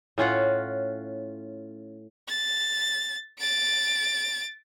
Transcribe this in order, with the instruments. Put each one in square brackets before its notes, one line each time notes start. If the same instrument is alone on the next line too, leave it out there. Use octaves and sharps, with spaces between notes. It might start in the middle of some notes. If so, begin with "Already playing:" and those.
[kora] A2 C#4 F4 F#5
[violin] A6
A6 D7